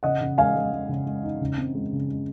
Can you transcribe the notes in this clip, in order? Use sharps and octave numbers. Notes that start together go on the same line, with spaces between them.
C#3 D#5 F#5
C#3
G#3 F5 G#5
G#3
G#3
C#3
G#3
D#4
C#3
C4
G#3
C#3
G#3